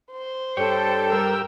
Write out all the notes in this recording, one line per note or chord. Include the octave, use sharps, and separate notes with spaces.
C5
G2 D4 G4 A4 C#5 G5
G3 A#4 C5 E6